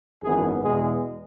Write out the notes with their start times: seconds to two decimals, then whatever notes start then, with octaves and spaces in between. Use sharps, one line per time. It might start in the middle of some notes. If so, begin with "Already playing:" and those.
0.22 G#1 F#2 E3 B3 G#4
0.62 E2 B2 G#3 G#4